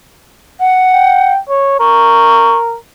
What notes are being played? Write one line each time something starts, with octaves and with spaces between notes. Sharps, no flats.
F#5
G5
C#5
A#4 C#6